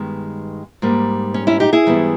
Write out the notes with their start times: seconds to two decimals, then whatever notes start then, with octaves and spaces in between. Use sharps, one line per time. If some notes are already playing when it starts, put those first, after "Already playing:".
Already playing: G2 D#3 G#3 B3
0.82 G#2 G3 A#3
1.34 C#4
1.47 C#4 E4
1.60 D#4 G4
1.73 E4 G#4
1.86 G#2 E3 G3 B3